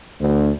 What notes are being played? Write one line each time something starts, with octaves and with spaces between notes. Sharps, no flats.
D2